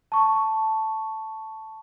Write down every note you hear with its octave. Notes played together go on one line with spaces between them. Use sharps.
A5 C#6